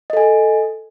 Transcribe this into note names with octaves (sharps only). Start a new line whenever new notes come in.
A4 D#5 G#5